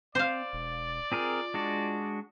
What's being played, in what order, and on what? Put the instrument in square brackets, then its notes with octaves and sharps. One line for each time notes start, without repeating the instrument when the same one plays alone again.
[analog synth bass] C4 [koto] C5 F5 [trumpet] D5
[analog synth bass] E1
[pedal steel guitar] C4 G#4 A#4 [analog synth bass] F4
[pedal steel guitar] G#3 D4 F#4